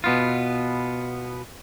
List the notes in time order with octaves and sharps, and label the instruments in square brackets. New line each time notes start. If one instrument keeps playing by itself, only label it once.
[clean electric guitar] B2 B3 F4